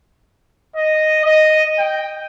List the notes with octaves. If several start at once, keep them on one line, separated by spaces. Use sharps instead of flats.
D#5
D#5
G5